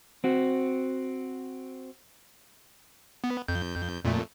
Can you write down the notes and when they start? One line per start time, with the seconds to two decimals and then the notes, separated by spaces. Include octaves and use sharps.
0.24 C4 F#4
3.24 B3
3.48 F2 G6
4.04 F2 A#2 A3